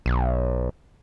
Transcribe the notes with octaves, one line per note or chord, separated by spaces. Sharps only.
B1